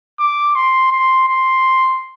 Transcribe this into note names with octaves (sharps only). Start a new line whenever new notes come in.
D6
C6
C6
C6